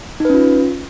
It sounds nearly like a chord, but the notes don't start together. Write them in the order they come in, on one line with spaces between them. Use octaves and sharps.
D#4 B4 C#4 F4